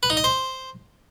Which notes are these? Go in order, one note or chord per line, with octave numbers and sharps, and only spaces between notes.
B4
D#4
D#5
C5